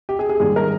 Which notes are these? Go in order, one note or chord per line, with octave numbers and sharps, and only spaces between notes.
G4
G#4
G#4
G#2 D#3 G3 A#3 G#4
A#4